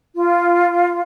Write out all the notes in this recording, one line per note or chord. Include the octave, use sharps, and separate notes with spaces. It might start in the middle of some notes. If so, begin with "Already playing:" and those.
F4